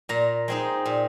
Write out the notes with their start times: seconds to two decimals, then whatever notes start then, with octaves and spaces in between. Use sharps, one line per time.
0.09 A#2 A#5
0.48 G#3 C4 D#4
0.86 A#2